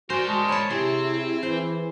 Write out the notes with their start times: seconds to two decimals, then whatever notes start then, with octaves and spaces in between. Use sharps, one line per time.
0.10 F#4 A#4 C5 D5 G#5
0.28 G#3 A5
0.49 C#5 A5 B5
0.71 C3 C4 E4 G#4
1.43 E3 C5